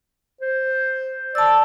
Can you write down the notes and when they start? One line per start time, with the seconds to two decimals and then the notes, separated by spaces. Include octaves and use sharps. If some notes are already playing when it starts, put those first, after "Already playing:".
0.41 C5
1.35 D5 A5 E6